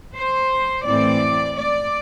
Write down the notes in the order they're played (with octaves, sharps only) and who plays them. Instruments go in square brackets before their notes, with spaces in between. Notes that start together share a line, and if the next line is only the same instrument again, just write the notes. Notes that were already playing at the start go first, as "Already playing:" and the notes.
[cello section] C5
A2 E3 A3 C4 D5
D5